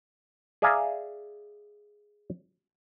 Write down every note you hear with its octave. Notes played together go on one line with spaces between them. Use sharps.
G#4 D5 E5 F5 G#5 A#5